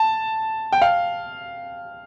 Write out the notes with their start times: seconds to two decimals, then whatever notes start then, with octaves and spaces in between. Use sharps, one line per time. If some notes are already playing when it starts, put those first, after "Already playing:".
Already playing: A5
0.72 G5
0.82 F5